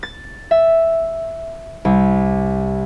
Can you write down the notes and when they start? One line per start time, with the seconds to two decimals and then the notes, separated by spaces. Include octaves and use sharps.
0.03 A6
0.51 E5
1.85 C2